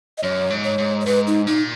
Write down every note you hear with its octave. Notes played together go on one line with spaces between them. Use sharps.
D#5
F#2 C#5
G#2
C#5
G#2
C#5
G#2 B4
D#4
A#2 D#4